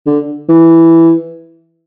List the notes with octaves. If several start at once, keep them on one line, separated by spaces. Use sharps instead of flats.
D3
E3